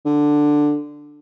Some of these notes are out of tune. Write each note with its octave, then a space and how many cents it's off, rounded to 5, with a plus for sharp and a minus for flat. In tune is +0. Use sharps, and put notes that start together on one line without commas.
D3 +5